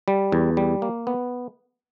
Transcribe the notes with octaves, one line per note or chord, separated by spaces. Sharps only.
G3
E2
G3
A#3
B3